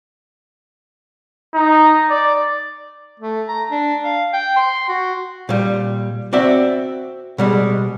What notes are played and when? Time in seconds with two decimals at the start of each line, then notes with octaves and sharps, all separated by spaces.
1.55 D#4
2.10 D5
3.20 A3
3.48 A#5
3.71 D4
4.04 F5
4.33 G5
4.56 C6
4.88 F#4
5.49 A#2 G3
6.33 C4 F#4 D5 E5
7.38 B2 G3 G#3